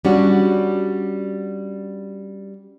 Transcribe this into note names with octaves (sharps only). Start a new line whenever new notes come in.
G3 C#4 D4 F#4